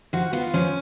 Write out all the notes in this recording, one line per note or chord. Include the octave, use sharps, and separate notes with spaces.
F3 F#4
B3 F4
F3 C#4